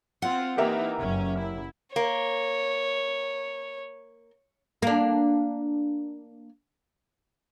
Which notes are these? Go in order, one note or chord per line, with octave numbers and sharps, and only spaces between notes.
C4 F4 F#5
E3 A#3 D#4 G4 A#4 E5
F#1 F#2 C#4
E4
A#3 C#5
A#3 D4